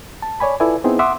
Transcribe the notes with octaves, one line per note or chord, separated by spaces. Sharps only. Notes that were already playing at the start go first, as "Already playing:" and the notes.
A5
C#5 D5 G#5 B5
E4 F4 A4 B4 D5 G#5
B3 C4 D#4 E4 G#4
E5 F#5 C6 D6 D#6